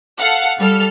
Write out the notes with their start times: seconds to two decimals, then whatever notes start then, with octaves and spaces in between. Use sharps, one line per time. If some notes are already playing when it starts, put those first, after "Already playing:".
0.18 A4 F5 F#5
0.59 G3 A4 F6